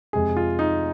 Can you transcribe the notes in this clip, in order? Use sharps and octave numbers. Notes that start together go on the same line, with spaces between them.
F2 C3 G#3 G#4
F4
D#4